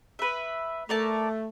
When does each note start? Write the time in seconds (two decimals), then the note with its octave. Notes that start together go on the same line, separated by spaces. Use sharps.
0.19 B4 E5
0.89 A3 A#4 D5 A5